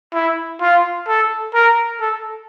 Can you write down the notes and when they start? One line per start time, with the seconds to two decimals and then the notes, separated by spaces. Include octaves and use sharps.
0.13 E4
0.61 F4
1.08 A4
1.54 A#4
2.00 A4